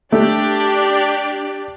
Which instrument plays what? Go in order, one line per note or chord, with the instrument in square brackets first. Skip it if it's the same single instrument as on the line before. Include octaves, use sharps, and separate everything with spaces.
[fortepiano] A3 [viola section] D4 G4 D5